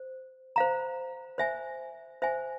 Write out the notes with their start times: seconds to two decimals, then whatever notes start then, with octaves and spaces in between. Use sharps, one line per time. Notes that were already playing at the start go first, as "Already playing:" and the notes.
Already playing: C5
0.56 C5 F5 A#5
1.38 C5 E5 G#5
2.22 C5 E5 G#5